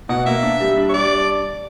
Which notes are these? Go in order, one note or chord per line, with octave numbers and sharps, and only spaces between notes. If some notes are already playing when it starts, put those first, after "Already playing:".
B2 F#5
A#3 E5
D4
G3
D4
C#5
G3 D5